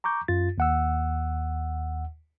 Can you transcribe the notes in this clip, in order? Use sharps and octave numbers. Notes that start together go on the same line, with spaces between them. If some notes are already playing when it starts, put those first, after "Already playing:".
A#5 C#6 D6 G6
F#2 F4 A6
D#2 F#5 E6